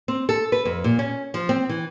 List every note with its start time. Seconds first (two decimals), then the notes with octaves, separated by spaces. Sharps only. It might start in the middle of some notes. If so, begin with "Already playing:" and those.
0.08 C4
0.29 A4
0.52 B4
0.65 F2
0.84 A#2
0.99 C#4
1.34 F3
1.49 C4
1.69 E3